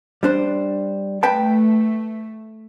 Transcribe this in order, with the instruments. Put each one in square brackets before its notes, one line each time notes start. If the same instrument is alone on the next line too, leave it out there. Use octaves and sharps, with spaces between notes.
[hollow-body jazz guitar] G3 D4 C5
[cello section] A3 [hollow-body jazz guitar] B4 G5 A5